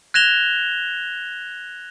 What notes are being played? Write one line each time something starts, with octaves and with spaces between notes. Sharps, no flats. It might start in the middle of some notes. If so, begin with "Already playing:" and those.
F#6 G#6 A#6 E7 F7 G7